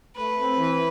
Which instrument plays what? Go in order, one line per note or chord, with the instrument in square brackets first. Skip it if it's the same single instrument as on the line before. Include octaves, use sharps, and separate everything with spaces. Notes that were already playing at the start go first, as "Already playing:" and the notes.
[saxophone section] A3 [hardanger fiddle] B4
[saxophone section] C4
E3